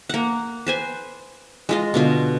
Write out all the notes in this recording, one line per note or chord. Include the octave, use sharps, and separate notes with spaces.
A#3 F#5
B4 C5 G#5
G#3 F4 D#5
B2 D3 F4